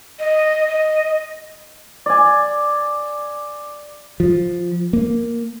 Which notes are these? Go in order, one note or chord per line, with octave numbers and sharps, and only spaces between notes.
D#5
D#5
D5 G#5
F3
A#3